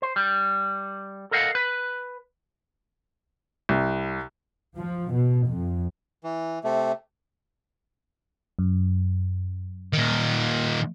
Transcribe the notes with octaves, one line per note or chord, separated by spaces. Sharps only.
C5
G3
A4 A#4 D#5 F5 F#5
B4
C2
F3
B2
F2
E3
C3 A3
F#2
A#2 D#3